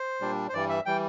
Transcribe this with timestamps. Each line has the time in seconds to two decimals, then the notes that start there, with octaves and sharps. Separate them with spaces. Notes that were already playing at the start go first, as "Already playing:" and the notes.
Already playing: C5
0.21 A#2 G3 D4
0.49 C5
0.53 G2 E3 G3 D5
0.69 E5
0.86 E3 G3 G5